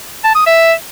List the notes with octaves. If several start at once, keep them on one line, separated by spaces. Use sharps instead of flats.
A5
D#6
E5